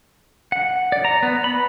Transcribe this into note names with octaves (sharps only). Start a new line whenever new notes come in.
F#5
D5
A#5
B3
B5